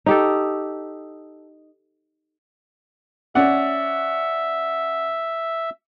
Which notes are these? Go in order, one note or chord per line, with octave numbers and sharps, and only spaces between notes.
D#4 G4 A4
C#4 D5 E5 F#5